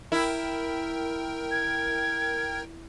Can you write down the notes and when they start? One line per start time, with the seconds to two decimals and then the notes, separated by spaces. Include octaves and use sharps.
0.12 E4 A#4 G5
1.51 G#6